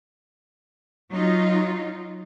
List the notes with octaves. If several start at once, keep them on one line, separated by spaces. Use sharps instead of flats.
F#3 D#4 F4